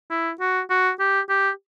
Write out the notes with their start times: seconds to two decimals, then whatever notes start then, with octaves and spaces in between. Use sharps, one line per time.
0.10 E4
0.40 F#4
0.70 F#4
1.00 G4
1.29 G4